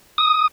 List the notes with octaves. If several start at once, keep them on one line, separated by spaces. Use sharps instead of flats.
D#6